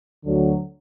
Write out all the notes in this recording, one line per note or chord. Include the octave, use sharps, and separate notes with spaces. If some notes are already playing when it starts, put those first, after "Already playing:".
D2 D3 F#3